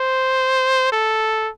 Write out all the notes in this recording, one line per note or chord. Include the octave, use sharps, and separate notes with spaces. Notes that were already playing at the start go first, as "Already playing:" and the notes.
Already playing: C5
A4